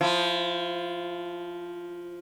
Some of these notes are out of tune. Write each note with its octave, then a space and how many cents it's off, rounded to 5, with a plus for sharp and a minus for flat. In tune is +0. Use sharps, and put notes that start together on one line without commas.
F3 +0 E4 +30